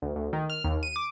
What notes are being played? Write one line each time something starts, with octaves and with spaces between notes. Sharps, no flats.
D2
D2
D#3
F6
D#2
D#7
D6